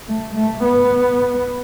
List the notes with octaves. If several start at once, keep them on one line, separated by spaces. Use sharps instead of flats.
A3
A3
B3